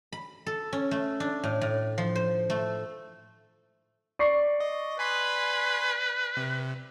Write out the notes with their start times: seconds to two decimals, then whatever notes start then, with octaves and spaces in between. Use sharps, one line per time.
0.12 B5
0.46 A4
0.73 C#4
0.91 A3
1.20 D4
1.44 A2
1.61 A2
1.98 F3
2.15 C5
2.50 A3
4.19 D5 C#6 C7
4.60 D#5
4.99 B4 G#5 B5 C6
6.37 C3